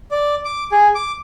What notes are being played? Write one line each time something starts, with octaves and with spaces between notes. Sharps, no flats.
D5
D6
G#4
D6